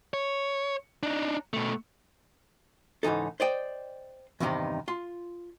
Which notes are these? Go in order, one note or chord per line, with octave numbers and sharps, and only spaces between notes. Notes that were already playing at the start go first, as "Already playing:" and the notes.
C#5
D4 D#4
B2 A3
C#2 G#2 E3 D#4 A4
C5 D5 D#5 G5
E2 G2 C3 D#3 D#4
F4 C6